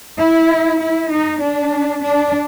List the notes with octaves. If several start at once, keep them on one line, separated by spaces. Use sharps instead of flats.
E4
E4
D#4
D4
D4